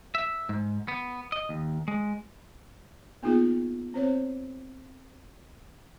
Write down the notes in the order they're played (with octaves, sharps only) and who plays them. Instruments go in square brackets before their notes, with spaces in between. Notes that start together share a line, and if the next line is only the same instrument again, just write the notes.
[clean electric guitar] E5
G#2
B3
D#5
D#2
G#3
[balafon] A#3 B3 D#4 F4 G#4
C4 C5 C#5